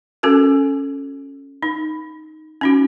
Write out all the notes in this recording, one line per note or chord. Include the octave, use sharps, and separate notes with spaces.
C#4 F#4 A4 A#4
D#4
C#4 D#4 F#4